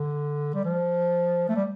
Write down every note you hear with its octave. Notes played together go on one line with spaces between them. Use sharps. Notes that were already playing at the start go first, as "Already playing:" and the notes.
Already playing: D3
G3
F3
A3
G3